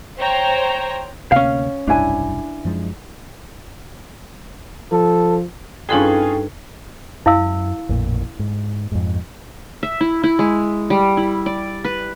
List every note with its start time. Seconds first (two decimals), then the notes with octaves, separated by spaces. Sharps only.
0.18 C5 C#5 G5 A#5
1.32 D2 C3 A#3 C#4 F5
1.87 F1 B1 G2 D4 E4 G#5
2.65 F#2 F3 G#3
4.92 F3 A4
5.89 G2 C#4 D#4 F4 G#4 A4 B4 G5
7.26 F#2 E4 F5 E6
7.89 A1 F2 A#2
8.39 G#2
8.92 F2 G#2
9.83 E5
10.01 E4
10.24 E4
10.39 G#3
10.90 G3
11.17 E4
11.46 D5
11.85 B4